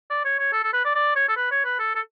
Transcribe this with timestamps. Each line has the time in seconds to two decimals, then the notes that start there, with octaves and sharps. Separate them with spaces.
0.10 D5
0.25 C#5
0.39 C#5
0.53 A4
0.63 A4
0.73 B4
0.85 D5
0.95 D5
1.16 C#5
1.28 A4
1.37 B4
1.51 C#5
1.65 B4
1.79 A4
1.96 A4